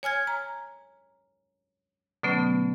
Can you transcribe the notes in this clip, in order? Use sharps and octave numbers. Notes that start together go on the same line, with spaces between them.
C#5 G#5 F6 G#6
A#5
B2 D3 F#3 A3 B3 C#4